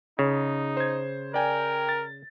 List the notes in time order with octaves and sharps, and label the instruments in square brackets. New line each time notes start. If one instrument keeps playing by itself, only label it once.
[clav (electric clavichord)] C#3 [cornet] D#4
[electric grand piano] C5 G#6
[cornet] A#4 [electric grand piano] D5 G5 G#5
[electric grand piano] A6